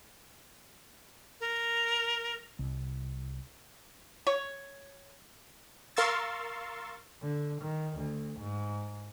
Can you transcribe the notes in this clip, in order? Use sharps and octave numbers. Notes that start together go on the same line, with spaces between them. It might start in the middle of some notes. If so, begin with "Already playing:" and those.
A#4
C2
C#5
A#4 F5 C6 C#6 E6 A6
D3
D#3
D2
G#2